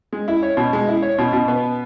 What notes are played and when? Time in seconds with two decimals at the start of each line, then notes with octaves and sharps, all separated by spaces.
0.13 G#3
0.28 E4
0.43 C#5
0.57 B2
0.73 G#3
0.88 E4
1.02 C#5
1.18 B2
1.33 B2
1.48 B3